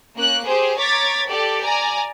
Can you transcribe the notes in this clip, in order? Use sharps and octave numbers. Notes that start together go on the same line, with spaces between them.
A#3 C#4 F#6
G4 G#4 C5
C#5 A#5 D6 G#6 A6 B6
G4 A4 D5
D5 G#5 A#5